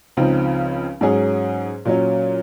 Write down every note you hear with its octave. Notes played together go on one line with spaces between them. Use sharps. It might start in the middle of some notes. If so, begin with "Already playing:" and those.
C#2 C#3 F3 C4 D#4
G#2 F#3 C#4 G#4
A#2 F#3 C#4